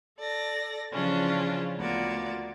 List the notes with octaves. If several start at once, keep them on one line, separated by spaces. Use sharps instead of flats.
A4 D5 A#6
C#3 E3 F3 C#4 D4 F4
D2 A#3 B3 F4 F#4 D5